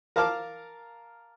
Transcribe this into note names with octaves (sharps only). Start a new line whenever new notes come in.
A#4 F5 A5 D6 F6